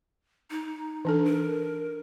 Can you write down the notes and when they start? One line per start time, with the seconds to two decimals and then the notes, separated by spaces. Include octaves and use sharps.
0.50 D#4
1.05 E3 D4 A4
1.25 A#4